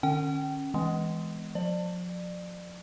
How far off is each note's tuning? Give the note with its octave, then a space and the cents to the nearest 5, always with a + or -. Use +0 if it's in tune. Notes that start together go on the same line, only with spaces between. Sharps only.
D3 +45 C#4 -15 G5 -35
E3 +0 G#3 +0 B3 +30
F3 +35 D5 +30